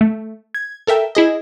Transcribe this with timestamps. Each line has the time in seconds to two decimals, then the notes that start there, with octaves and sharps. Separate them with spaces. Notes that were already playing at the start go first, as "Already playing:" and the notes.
0.01 A3
0.55 G#6
0.87 A4 A#4 E5 G5
1.15 E4 G#4 D#5